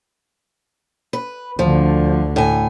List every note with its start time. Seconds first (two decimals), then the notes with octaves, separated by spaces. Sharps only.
1.13 B4
1.59 D2 D3 F3
2.36 A2 G#5